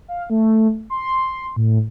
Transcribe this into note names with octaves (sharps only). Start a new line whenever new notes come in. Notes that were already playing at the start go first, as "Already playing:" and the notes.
F5
A3
C6
A2